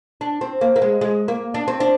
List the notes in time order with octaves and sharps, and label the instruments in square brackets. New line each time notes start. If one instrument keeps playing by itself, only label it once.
[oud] D4
C4
A#3
A#3
G#3
G#3
A#3
D4
C4
D4